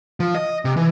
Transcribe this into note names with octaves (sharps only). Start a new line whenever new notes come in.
F3
D#5
C3
E3